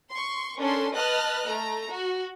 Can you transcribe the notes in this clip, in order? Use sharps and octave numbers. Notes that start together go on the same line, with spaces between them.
C6 C#6
C#4 D4 A4 A#4 C6
B4 D#5 A5 F6 F#6
A3 A#5
F#4